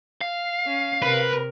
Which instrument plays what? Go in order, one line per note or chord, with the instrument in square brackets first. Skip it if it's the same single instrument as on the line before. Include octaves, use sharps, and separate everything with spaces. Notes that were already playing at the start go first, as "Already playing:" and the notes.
[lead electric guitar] F5
[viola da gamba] C#4
[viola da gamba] C3 A#4 [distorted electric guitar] B4